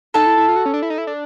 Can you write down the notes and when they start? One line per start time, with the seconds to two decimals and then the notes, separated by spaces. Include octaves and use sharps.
0.14 D#4 A4 A5
0.27 E4
0.37 E4
0.48 F4
0.56 F#4
0.66 C#4
0.74 D4
0.82 E4
0.90 D#4
0.98 E4
1.07 D4